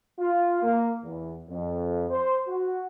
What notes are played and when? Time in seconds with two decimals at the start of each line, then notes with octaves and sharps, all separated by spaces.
0.19 F4
0.62 A#3
1.03 E2
1.49 F2
2.11 C5
2.48 F#4